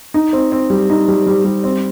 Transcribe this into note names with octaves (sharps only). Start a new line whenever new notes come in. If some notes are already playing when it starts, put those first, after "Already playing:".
D#4
C4
C4
G3
D#4
G3
G3
G3
C4